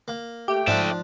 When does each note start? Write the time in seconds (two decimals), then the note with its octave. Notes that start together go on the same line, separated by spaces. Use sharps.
0.08 A#3
0.48 A3 G4 G5
0.68 G#2 F3 D4 D5 E5